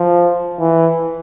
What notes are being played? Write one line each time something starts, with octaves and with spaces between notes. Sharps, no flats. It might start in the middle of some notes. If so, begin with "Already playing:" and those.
Already playing: F3
E3